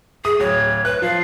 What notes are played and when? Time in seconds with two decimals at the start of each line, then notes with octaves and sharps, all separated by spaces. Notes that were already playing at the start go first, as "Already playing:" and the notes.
0.25 G#4 D#6
0.40 D1 C#5
0.85 B4 F#6
1.02 F3 F5